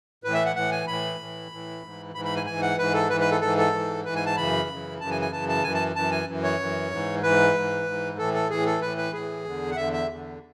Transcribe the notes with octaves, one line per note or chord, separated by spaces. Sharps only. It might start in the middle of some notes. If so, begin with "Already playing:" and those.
A2 E3 B4
E5
F#5
A2 E3 F#5
G#5
A2 E3 B5
A2 E3
A2 E3
G#2 E3
G#2 E3 B5
B5
G#5
G#2 E3 G#5
F#5
G#2 E3 B4
A4
G#2 E3 B4
B4
A4
G#2 E3 A4
A4
G#2 E3
G#2 E3 B4
G#5
A5
F#2 C#3 E3 B5
F#2 C#3 E3
F#2 C#3 E3 A5
G#5
G#5
F#2 C#3 E3 A5
A5
F#2 E3 G#5
A5
F#2 E3 A5
G#5
F#2 E3
C#5
F#2 E3
G#2 E3
G#2 E3 B4
G#2 E3
G#2 E3
A2 E3 A4
A4
A2 E3 G#4
A4
A2 E3 B4
B4
A2 E3 G#4
E2 D3
F#5
E2 D3 E5
E5
E2 D3